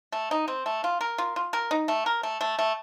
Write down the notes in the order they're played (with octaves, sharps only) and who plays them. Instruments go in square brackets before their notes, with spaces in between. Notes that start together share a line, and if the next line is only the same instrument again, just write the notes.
[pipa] A3
D#4
C4
A3
F4
A#4
F4
F4
A#4
D#4
A3
A#4
A3
A3
A3